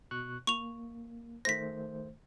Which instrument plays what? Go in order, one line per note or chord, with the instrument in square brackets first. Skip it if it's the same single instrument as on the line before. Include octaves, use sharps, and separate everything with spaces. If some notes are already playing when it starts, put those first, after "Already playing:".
[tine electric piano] B2 C#6 F#6
[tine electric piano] A#3 [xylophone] C#6 F7
[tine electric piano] D#3 A3 C5 [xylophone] A#6 B6